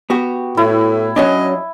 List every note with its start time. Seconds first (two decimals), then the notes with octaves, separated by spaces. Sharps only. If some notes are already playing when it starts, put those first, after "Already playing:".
0.10 B3 F#4 G4
0.57 A2 E4
1.16 F#3 C#4 D4 D#5